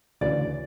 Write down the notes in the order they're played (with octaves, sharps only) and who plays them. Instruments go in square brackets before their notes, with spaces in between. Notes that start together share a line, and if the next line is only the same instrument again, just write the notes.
[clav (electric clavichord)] D2 C#3 E3 [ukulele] D5